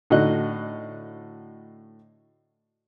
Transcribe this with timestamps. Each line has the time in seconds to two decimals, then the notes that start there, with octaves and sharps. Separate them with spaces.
0.10 A2 D3 D#4 F#4 D#5 F#6